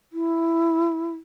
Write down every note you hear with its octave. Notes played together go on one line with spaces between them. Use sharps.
E4